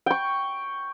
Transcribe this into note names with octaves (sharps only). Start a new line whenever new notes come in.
G5 C#6